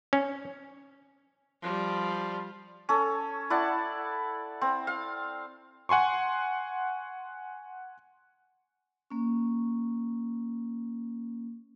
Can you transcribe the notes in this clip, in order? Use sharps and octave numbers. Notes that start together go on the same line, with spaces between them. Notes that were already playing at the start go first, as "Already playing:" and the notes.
C#4
F3 G3
C#4 A4
E4 D5 F#5 A5
C4
F5
F#5 G#5 C6 C#6
A#3 C#4